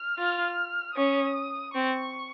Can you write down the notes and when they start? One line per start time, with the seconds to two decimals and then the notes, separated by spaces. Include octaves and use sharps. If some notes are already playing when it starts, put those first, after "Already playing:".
Already playing: F6
0.18 F4
0.96 C#4 D#6
1.74 C4 C#6